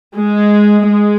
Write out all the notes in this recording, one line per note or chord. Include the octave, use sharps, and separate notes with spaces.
G#3
G#3